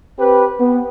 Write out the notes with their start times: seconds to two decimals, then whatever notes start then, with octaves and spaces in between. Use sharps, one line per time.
0.18 C4 G4 B4
0.59 B3